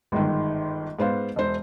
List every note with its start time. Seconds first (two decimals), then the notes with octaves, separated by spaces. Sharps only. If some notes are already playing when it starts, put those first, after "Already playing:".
0.12 G1 G#2 D#3
0.99 G#2 B3 C5 F5
1.36 E1 C5